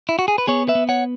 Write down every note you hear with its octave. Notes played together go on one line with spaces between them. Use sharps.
E4
F#4
G#4
B4
B3 G#4 C#5
B4 E5
B3
C#5 F#5